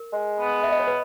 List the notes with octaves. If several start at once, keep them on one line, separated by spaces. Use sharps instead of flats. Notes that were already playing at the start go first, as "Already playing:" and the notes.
Already playing: A#4
G#3
B3
E5
G#3 D#5
C#5
B4